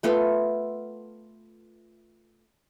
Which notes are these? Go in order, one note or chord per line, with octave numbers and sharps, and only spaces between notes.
A3 B3 F4 A4